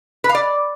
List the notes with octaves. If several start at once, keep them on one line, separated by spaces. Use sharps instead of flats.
B4
F5
D5